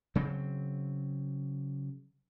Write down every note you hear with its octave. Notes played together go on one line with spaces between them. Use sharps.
C#3 F#3 C4